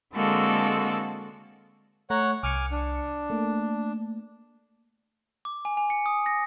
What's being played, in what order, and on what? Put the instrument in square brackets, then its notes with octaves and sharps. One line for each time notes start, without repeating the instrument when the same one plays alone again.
[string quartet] D3 G#3 A#3 C4 F#4 A4
[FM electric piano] A3 A#5 [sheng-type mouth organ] C#5 F#5
[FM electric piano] C2 C#7 [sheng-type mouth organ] G#5 D6 F6
[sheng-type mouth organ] D4
[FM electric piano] A3 A#3
[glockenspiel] D6
G#5
G#5
C#7
D#6
A#6